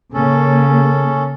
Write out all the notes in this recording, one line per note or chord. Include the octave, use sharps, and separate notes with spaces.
C#3 A#3 C#4 A4